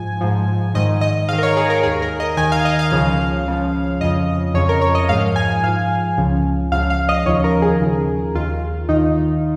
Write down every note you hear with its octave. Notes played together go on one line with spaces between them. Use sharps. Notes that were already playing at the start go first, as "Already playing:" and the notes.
Already playing: G#2 F3 G#5
G#2 F3
G#2 D#3 D#5
D#5
G#2 D#3 F5
A#4
C#5
G#4
A#4
D#2 D#3 G#4
A#4
D#5
D#2 D#3 G#5
F5
D#5
F5
C#2 C#3 F3
C#2 C#3 F3
F2 C#3 F3 D#5
F2 C#3 F3 C#5
A#4
C#5
D#5
G#2 F3 F5
G#5
G#2 F3 F5
C#2 C#3 F3
C#2 C#3 F3 F5
F5
D#5
D#2 C#3 F3 C#5
A#4
G#4
D#2 C#3 F3
D#2 D#3 F4
D#2 D#3 D#4